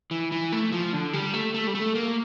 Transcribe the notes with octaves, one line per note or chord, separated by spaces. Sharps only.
E3
E3
A3
F3
D3
G3
A3
A3
G3
A3
A#3